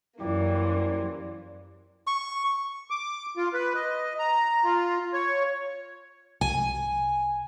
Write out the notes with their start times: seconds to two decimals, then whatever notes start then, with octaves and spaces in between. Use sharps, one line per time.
0.20 F#2 E3 A#3 G4 D5 A#5
0.51 G3 C5
2.07 C#6
2.90 D6
3.37 F4
3.53 B4
3.75 D#5
4.19 A#5
4.64 F4
5.14 C#5
6.41 C2 G#5